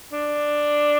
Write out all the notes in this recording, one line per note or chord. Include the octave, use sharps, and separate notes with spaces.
D4